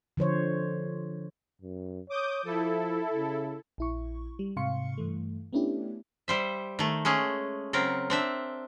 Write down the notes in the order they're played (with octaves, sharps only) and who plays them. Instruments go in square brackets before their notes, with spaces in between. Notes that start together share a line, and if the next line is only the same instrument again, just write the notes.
[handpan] D3 F3 C5 C#5
[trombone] F#2
[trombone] C#5 [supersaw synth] D6 D#6 G6
[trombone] F3 [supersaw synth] E4 A4
[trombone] C#3
[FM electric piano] A#1 E4 C#6
G3
G#2 C3 F5 C6 C#6 C#7
G2 E3 A3
A3 B3 C#4 D4 E4 G4
[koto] G3 C5 E5
D#3 A3
G#3 A3 C#4 G#4
C#3 F#3 C4 A#4
C4 D4 E5